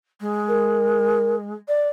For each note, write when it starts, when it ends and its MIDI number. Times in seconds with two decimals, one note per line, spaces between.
0.21 1.53 56
0.48 1.35 70
1.68 1.89 74